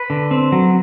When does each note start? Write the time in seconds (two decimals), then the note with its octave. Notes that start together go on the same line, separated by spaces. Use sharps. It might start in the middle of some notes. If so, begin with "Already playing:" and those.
Already playing: B4
0.10 D3
0.31 C4
0.52 F#3